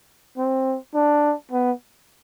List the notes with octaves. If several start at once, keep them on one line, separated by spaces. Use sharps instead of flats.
C4
D4
B3